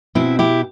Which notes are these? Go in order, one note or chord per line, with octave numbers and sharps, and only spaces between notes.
B2 C4 E4
E4 G4